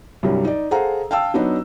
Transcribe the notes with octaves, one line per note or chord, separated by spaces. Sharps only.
C2 G2 F#3 G3
D#4 D5
G#4 A4 C5 F5 F#5 A#5
F5 G5 A5 E6
F#3 B3 D4 D#4